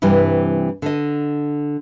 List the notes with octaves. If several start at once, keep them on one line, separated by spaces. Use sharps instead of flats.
G2 C3 E3 G3
D3 D#5